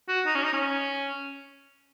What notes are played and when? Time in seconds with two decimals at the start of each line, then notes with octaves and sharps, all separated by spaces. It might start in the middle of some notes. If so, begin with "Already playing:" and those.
0.08 F#4
0.26 D#4
0.35 C#4
0.44 D#4
0.53 C#4